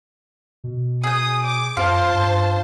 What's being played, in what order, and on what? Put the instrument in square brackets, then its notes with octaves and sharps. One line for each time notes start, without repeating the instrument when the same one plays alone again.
[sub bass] B2
[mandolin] G#4 G6 [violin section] D#6
[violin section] D6
[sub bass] F#2 [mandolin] F4 [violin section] C5 A5
[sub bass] G2